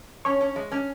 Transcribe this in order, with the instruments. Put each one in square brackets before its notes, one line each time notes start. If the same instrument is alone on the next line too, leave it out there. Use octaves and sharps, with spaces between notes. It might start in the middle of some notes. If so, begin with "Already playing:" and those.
[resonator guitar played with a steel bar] C#4 [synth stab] C#5
[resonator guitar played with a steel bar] C#4
G#3
C#4